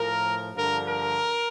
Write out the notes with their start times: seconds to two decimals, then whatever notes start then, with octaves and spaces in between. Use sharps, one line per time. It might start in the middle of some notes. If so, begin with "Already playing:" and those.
Already playing: A2 F3 A#4
0.54 G2 D3 F3 A#4
0.86 A#4